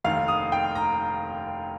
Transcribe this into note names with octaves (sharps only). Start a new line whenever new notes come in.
F1 D#2 D#3 F5
D#6
G5
A#5